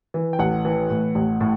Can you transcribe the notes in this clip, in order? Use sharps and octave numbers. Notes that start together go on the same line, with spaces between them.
E3
G5
A1 F#5
E3
A2
A1
A2